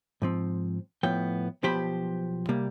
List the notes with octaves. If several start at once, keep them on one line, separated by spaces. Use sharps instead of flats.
G#2 F3 C4
A2 F3 B3 G5
B1 B2 F3 G4 C5 B5
C3 G3 A#3